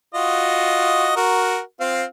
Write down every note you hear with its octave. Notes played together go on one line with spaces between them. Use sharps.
F4 F#4 D#5
F#4 A#4
C4 F4 F5